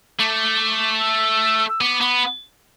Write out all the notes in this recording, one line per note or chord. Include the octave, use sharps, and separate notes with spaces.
A3 D6
E6
E6
B3 D6
B3